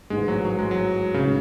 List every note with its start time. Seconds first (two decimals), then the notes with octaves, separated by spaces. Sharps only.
0.10 A1 G#2 E3 G#3
0.28 F#3
0.45 F#3
0.59 G#3
0.71 F#3
1.14 B1 A2 C#3 G#3 C#4